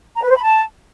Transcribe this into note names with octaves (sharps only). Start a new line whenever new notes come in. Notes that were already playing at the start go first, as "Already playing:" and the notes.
A#5
B4
C5
B5
A5